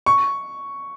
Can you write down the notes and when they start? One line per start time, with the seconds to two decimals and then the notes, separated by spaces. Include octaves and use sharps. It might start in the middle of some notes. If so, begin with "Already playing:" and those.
0.06 C#6